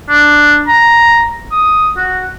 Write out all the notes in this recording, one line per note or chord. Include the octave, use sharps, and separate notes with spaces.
D4
A#5
D#6
F#4